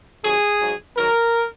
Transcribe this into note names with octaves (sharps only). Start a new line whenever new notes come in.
C3 D#3 F#3 G#4
G#2 F#3
G#2 D#3 F#3 A#4